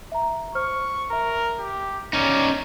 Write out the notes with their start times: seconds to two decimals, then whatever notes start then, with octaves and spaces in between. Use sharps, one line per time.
0.12 E5 A#5
0.55 C5 C#6 F6
1.10 A#4 E5 A#5
1.59 G4
2.13 C#4 D#4 D5